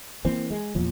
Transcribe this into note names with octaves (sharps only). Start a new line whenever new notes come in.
E3 A#3 C4
G#3
E2 A#2 F3